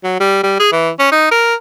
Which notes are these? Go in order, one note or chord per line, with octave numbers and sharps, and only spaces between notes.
F#3
G3
G3
G#4
E3
C#4
D#4
A#4